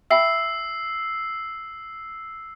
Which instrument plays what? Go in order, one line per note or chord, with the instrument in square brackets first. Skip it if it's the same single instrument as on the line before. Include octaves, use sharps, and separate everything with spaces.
[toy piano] E5 G5 B5 [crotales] E6 C7